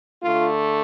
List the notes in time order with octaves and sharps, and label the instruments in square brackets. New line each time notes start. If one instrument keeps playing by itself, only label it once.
[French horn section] D3 A3 F4